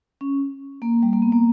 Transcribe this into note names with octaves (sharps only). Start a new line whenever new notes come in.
C#4
A#3
G3
A#3
B3
A#3